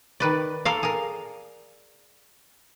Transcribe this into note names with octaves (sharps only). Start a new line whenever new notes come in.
D#3 B4 D5
A4 A#4 D5 F5
G#4 A#4